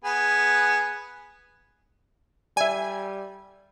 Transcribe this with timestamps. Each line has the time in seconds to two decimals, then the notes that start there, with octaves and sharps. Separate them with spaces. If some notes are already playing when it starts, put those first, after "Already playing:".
0.04 B3 G#4
2.57 G3 D5 E5 G#5